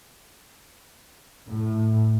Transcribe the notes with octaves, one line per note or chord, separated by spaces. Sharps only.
A2